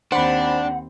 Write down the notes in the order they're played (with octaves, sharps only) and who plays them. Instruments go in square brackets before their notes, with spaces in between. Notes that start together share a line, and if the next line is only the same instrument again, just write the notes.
[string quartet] D#2 C4 [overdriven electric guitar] D4 [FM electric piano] C5 B5 [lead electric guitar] F#5